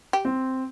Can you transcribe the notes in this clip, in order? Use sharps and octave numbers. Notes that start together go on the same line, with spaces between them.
G4
C4